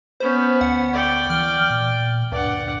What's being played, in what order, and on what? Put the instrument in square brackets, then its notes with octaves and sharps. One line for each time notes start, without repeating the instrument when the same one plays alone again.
[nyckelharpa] B3 C#4 [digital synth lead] C5
[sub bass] D2 [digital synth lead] F#5
[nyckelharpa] D5 G5
[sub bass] E3 [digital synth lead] F6
[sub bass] A#2
[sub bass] D2 [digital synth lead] G2 [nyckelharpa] D5 F#5